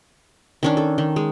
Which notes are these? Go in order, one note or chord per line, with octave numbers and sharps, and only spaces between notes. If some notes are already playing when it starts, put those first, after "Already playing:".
D#3 C#4 D4
A4
D#3
G#3